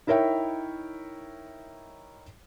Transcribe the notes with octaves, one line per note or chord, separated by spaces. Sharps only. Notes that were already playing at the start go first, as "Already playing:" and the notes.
D#4 E4 A#4 C#5 E5 G5